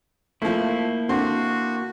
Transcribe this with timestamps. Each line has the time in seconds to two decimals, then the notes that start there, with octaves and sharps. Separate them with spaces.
0.42 F3 A3 A#3 E4
1.09 D3 C4 F#4 C6